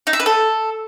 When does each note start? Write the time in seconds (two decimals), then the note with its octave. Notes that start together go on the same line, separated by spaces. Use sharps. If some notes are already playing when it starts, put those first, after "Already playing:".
0.07 D#4
0.13 E5
0.20 B4
0.26 A4